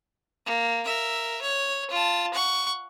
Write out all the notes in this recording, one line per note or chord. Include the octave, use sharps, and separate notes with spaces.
A#3
A#4 E5
C#5
F4 A5
F#5 C#6